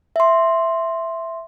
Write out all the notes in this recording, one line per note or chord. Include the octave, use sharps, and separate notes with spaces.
E5 C6